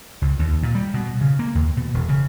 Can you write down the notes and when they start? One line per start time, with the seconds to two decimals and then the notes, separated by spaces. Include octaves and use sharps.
0.22 C#2
0.39 D#2
0.63 A#2
0.75 G3
0.94 B2
1.21 C#3
1.39 A#3
1.55 D#2
1.77 B2
1.94 E1
2.09 C#3